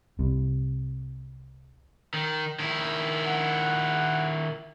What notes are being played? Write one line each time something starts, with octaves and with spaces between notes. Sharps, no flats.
C2 C3
D#3
D#3 E4
F#5